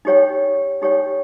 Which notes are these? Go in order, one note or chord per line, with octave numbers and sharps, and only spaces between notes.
D#4 G4 C#5 G5
D#4 G4 C#5 G5